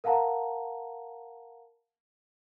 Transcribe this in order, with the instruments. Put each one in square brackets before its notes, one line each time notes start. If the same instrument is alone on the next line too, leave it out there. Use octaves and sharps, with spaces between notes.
[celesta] A#4 F5 F#5 A5 A#5